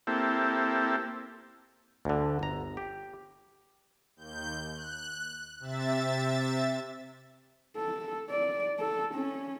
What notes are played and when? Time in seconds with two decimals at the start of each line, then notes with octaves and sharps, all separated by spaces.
0.07 A#3 C4 E4 G4 A4
2.05 D2 D3
2.39 G1 A#5
2.77 G4
4.16 D#2 G6
4.72 F#6
5.60 C3 E5 A6
7.77 A4
8.30 D5
8.79 A4
9.14 C#4